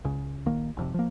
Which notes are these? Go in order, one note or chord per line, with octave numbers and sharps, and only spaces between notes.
C#2 C#3
A#1 D#3 A#3
G#1 F2 C3
F3 A#3